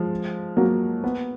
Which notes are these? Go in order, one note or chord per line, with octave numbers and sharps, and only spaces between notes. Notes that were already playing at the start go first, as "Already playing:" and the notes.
Already playing: F3 G#3
F#3 A#3
B3